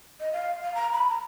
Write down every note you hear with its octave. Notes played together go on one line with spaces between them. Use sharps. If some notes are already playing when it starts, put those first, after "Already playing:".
D#5
F5
F5
A#5
B5
A#5